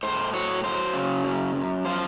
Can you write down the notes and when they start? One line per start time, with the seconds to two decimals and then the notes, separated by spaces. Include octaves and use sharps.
0.03 A2 C5
0.33 F#3 C#5
0.64 F#3 C5
0.94 C#3
1.24 F#2
1.55 F#2
1.85 F3 C5